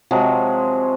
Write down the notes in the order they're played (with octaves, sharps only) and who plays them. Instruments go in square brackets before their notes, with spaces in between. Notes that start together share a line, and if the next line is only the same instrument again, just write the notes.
[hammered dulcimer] C3 F3 F#3 G#3